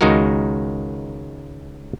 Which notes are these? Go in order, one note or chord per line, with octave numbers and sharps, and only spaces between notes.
C#2 D#3 G#3 D#4 F#4 A#4